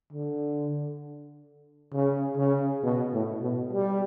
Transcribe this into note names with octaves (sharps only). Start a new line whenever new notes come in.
D3
C#3
C#3
B2
A2
B2
G3